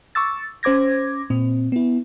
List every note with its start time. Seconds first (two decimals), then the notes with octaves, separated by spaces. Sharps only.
0.15 C#6 D6 E6 A6
0.63 C#4 C5 D6 G#6 A#6
1.30 A#2 C4
1.72 B3 E4